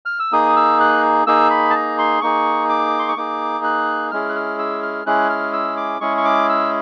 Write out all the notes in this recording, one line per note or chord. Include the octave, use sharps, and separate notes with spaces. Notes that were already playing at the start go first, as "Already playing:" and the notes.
F6
E6
A#3 D#4 G#4 D#6
E6
F#6
A#3 D#4 G#4 E6
B5
A5
A#5
C6
A#3 D#4 G#4 C#6
D6
C6
C#6
A#3 D#4 G#4 D6
F#6
G#3 C#4 E4 G#4 F6
F#6
F6
E6
F6
G#3 C#4 E4 G#4 F#6
F6
E6
D6
G#3 C#4 E4 G#4 C#6
C#6
D6
E6